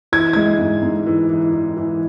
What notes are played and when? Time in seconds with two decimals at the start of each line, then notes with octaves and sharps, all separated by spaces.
0.12 E3 G#6
0.33 G#3 G#6
0.59 G#2
0.83 G#2
1.06 E3
1.30 E3
1.53 E3
1.77 E3